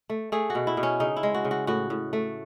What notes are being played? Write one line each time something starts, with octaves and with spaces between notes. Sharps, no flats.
A3
A3 G#4
F#4
B2
E4
B2
C#4
C#3 D#4
E4
G#3
F#4
C#3
F#4
A2 F#4
A2
A3